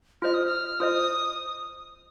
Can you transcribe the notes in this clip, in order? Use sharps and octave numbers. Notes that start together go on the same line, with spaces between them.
F4 C5 D#5 F6
D#6
F6
F4 C5 D#5 D#6